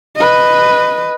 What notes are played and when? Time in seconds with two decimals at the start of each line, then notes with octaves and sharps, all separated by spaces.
0.16 B4 D#5